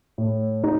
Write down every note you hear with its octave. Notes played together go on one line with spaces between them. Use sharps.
A2
D#4